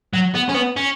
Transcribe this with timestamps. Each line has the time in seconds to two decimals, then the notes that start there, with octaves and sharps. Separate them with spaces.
0.13 F#3
0.35 B3
0.49 C#4
0.54 B3
0.76 C#4